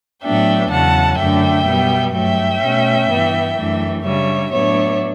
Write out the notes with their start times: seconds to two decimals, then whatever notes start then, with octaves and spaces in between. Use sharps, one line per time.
0.23 A2 F#3 B3 D4 E5 G5
0.71 E2 C#3 F#3 F#5 A5
1.18 F#2 D3 A3 D4 E5 G5
1.66 B2 G3 B3
2.14 G2 F#3 A3 E5 G5
2.62 B2 A3 C#4
3.09 G2 E3 B3
3.57 F#2 E3 A3 D4
4.05 C#3 G3 D4 C#5 E5
4.52 A2 F#3 B3 D4 C#5 E5